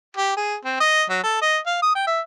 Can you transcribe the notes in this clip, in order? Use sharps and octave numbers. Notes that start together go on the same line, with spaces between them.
G4
G#4
C4
D#5
F#3
A4
D#5
F5
D#6
G5
E5